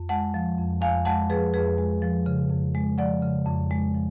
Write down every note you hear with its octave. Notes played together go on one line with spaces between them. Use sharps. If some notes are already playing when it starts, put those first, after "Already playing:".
Already playing: F2
G#3 F#5 A5
F3
F2
F2 F5 G#5
G#3 F#5 A5
F3 G#4 B4
F2 G#4 B4
G#3
F3
C#3
F2
G#3
F3 D5 F#5
C#3
F2
G#3
F3